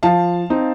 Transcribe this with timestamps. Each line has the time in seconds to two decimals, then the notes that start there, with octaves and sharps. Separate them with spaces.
0.03 F3 F5 A5
0.50 C4 D#4